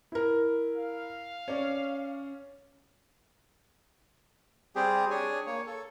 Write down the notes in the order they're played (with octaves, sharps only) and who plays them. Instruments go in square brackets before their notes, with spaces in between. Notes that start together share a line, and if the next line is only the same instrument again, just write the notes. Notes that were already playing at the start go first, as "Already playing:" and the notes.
[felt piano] E4 A#4
[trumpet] F5
[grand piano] C#4 [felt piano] C#5 D5
[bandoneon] G3 C4 G4 G#4
D4 G#4 C#5 G#5
A#3 C#5
A4